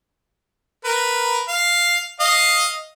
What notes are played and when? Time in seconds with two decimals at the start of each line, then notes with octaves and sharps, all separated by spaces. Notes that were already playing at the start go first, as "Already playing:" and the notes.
0.85 A#4 B4
1.48 F5
2.20 D#5 F5